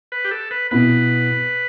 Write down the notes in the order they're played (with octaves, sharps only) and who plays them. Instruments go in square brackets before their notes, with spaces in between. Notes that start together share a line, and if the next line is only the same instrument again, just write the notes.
[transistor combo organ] B4
G4
A4
B4
[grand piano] B2 B3 E4 [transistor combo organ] B4